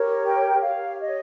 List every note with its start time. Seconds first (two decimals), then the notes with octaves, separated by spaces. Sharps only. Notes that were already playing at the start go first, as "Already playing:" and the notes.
Already playing: G4 A#4 C#5
0.24 G5
0.61 G4 C#5 F5
1.00 D#5